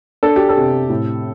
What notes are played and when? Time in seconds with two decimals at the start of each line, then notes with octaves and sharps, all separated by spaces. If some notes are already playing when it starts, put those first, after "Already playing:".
0.23 D4 A4
0.36 G4
0.49 A4
0.57 C3
0.89 A2